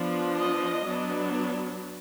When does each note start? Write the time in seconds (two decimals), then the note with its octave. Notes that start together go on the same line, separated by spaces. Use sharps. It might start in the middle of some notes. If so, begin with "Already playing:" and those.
Already playing: F3 B3 D4
0.37 D#5
0.85 F#3 B3 D4